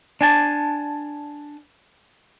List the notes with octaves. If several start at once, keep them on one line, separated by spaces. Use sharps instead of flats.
D4 G#5 A5